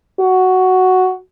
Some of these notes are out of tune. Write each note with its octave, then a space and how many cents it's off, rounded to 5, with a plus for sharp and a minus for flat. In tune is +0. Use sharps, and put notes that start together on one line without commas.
F#4 +5